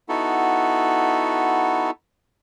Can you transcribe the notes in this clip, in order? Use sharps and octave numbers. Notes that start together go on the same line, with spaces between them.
B3 D#4 E4 F#4 A4